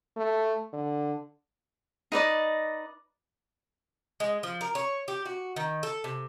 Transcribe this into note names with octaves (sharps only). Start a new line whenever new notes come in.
A3
D3
D#4 B4 D5 D#5
G#3
F3
A#4
C#5
G4
F#4
D#3
A4
C3